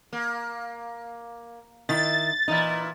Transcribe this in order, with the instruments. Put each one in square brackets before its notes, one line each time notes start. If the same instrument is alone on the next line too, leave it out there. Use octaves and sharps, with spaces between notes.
[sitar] A#3
[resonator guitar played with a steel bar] D#3 E4 E5 [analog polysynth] A6
[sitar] A#2 E3 E4 [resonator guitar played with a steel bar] D#4